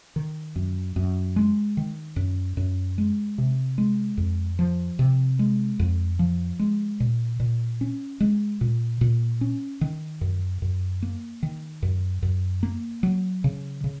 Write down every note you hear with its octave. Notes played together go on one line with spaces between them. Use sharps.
D#3
F#2
F#2
G#3
D#3
F#2
F#2
G#3
C3
G#3
F2
F3
C3
G#3
F2
F3
G#3
A#2
A#2
C#4
G#3
A#2
A#2
C#4
D#3
F#2
F#2
A#3
D#3
F#2
F#2
A#3
F#3
C#3
C#3